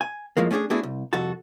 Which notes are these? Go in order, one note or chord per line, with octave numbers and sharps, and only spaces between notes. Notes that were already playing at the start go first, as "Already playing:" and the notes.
G#5
F2 A2 F3 G#3 A#3
A3 C#4 D4 F#4 G#4
A3 B3 D4 E4 F#4 G#4
C2
C2 F2 F#4 A4 A5